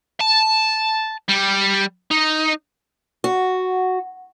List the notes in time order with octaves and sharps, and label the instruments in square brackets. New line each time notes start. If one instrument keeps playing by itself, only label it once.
[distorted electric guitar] A5
G3
D#4
[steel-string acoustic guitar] F#4